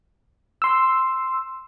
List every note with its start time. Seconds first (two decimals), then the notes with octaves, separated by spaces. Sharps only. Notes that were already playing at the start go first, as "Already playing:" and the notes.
0.62 C6 E6